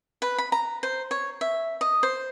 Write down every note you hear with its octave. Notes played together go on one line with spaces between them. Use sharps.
B4
B5
A#5
C5
C#5
E5
D#5
C5